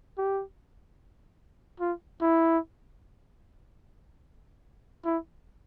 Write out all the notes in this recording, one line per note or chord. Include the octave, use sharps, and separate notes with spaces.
G4
F4
E4
E4